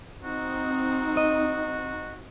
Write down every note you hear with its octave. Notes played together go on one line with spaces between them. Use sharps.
C4 D#4 F#4
D#5